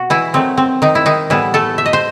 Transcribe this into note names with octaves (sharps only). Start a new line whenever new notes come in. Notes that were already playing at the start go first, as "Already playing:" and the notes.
Already playing: B2 F#4
E3 E4
D#3 F#3 A3 C4
C4
D#3 D#4
E4
D#3 D#4
A2 E3 G3 B3 E4
A3 A4
E5
D#5
C5